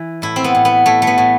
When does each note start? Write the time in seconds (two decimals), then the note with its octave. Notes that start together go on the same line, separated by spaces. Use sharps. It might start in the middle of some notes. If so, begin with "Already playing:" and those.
Already playing: E3
0.22 A2 E4
0.36 C4
0.44 B3
0.55 A2
0.65 B3
0.86 A2 A3
1.02 A3
1.07 B3
1.18 A2